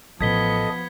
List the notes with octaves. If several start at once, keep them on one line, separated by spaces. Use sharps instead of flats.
A1 F3 B3 A4 D#5 G#6 B6 G7